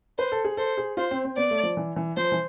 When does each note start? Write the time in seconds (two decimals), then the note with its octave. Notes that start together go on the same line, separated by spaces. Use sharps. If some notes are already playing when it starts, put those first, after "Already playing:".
0.18 B4 C5
0.32 A4
0.45 G#4
0.57 A4 C5
0.78 G#4
0.97 F4 C5
1.11 C4
1.25 C4
1.37 B3 D5
1.51 A3
1.63 F3
1.77 E3
1.96 E3
2.17 F3 C5
2.32 E3